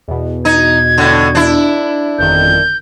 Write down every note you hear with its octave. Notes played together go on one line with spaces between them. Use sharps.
E2 B2
D#4 G#6
A2 D3
D4 E4
G1 F2 D#3 G6